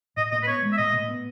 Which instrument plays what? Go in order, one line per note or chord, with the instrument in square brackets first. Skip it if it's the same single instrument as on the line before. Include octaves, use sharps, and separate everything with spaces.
[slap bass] A2 [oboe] D#5
[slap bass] A2 [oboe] D#5
[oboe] B4
[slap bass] B3 [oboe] C#5
[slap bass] G#3
[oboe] E5
[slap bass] A2 [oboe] D#5
[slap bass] A2
B3